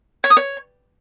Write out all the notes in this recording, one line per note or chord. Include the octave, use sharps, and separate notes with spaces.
C#5
D#6
C#5